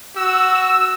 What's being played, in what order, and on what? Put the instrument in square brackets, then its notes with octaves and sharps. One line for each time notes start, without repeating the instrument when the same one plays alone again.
[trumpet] F#4 [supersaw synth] E6